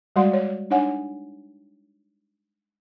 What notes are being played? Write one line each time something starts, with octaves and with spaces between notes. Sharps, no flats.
G3 G#3 F#4 D5 F#5 C6
C#5
D4 D#4 C#5 F#5 G#5